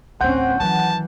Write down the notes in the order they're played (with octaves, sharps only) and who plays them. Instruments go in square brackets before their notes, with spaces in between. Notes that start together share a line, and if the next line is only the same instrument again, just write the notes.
[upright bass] A1 D2 [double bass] C4 C#4 [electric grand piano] F#5 G6
[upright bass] D#3 F#3 [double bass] E3 [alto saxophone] A5